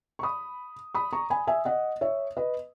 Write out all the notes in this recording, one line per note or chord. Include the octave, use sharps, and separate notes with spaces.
C#6
B5 D#6
B5 D#6
A#5 C#6
G#5 B5
E5 G#5
D#5 F#5
C#5 E5
B4 D#5